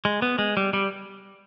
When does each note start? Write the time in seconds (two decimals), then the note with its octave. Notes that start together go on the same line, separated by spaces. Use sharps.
0.05 G#3
0.22 B3
0.39 G#3
0.57 G3
0.73 G3